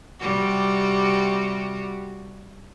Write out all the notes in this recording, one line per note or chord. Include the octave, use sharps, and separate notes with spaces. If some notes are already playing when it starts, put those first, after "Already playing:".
C3 G3 F#4